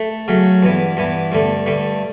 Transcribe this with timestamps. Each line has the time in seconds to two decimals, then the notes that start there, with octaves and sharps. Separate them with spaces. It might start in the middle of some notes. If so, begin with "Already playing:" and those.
Already playing: A3
0.28 C#3 F#3 A3
0.62 G2 E3 B3
0.97 G2 E3 B3
1.32 G2 D3 A3
1.66 G2 D3 A3